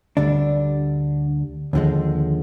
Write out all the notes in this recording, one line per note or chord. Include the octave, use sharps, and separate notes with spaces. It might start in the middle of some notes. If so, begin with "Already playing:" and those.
D2 D3 G3 D4
D#2 D3 F3 G#3